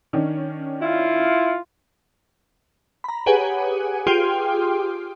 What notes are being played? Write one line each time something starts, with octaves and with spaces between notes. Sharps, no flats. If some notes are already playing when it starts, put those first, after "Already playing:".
D#3 C#4 D4
E4 F4
A#5 B5
G4 G#4 B4 C#5 F#5 G#5
F4 G4 G#4 G5 C6 F6